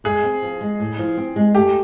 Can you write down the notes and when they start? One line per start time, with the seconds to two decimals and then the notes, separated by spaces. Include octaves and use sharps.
0.04 G#3 G#4
0.24 C4
0.42 F3
0.61 G#3
0.80 A2
0.98 F3
1.17 C4
1.36 G#3
1.55 A3 G4